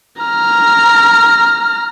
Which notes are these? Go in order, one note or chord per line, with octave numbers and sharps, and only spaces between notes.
A#5 F6